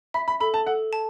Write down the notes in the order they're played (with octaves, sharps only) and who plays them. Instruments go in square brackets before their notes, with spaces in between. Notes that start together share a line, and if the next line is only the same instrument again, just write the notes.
[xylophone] E5 [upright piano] B5
[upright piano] B5
[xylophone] A4 [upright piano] B5
[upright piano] A5
[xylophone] A4 [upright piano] F#5
[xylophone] A5